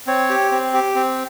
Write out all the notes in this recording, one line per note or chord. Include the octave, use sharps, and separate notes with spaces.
C4 C#5
G4
C4
G4
C4